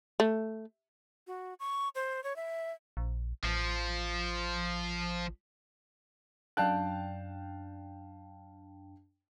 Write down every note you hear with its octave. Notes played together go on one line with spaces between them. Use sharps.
A3
F#4
C#6
C5
C#5
E5
A#1
A1 F3
F#2 D4 F5 G5 A5 F#6